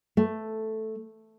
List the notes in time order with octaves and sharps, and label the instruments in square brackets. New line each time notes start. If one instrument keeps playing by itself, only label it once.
[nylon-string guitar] A3